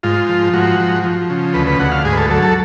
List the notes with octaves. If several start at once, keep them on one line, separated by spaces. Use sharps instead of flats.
G#2 F4
F3
G#2 F#4
F3
F3
C#3
D2 B4
B4
D2 F#5
F5
G#2 G#4
B4
A4
F#3 A4
A4